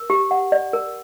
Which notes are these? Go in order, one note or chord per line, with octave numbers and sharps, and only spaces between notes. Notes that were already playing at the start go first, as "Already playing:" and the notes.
Already playing: A#4
G4
F#5
D5
A#4